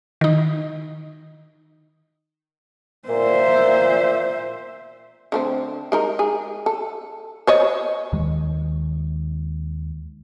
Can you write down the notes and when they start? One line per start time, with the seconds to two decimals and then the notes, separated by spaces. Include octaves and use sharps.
0.21 D#3 D#4
3.08 A#2 C5 E5
5.32 D3 A3 C4
5.92 G#3 D#4 A#4
6.19 G#4
6.66 A4
7.47 C5 C#5 D#5
8.13 D#2 D#3 G#3